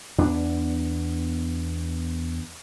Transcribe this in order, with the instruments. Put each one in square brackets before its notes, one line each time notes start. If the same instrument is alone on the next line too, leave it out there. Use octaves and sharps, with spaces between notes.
[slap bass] E2 B3 D4